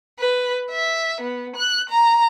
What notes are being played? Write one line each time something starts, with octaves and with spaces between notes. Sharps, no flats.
B4
E5
B3
F#6
A#5